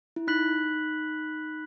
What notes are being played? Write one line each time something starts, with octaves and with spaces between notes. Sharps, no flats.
E4
D#4 B5 F#6 B6 F#7